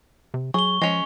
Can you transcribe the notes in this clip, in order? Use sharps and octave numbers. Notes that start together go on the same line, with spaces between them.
C3
F#3 G#4 C#6 G7
F3 G#3 C#4